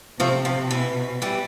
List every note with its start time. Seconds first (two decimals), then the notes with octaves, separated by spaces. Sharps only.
0.19 C3 F3 A3
0.45 F3
0.71 B2 E3
1.22 E3 G3